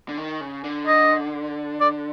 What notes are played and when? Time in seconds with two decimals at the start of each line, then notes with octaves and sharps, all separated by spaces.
0.09 D3
0.17 D#3
0.41 C#3
0.64 D3
0.87 D#5
1.81 D5